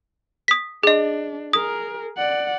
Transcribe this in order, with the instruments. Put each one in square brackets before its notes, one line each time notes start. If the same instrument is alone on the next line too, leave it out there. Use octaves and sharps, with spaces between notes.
[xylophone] D#6 B6
[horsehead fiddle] D4 [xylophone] G#4 D#5
[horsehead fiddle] G#4 A#4 [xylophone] D#6
[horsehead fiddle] D5 F#5